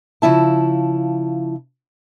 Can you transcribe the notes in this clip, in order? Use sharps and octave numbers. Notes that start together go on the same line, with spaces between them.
C#3 F3 E4 A5